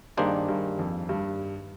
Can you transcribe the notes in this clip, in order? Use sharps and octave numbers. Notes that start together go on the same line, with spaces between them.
G2 D#3 A#3 D4 G#4 C5
G2
F2
G2